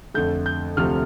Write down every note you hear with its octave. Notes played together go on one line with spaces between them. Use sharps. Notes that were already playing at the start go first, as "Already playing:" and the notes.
F2 D3 A3 G6
G6
D2 C3 F3 A3 F6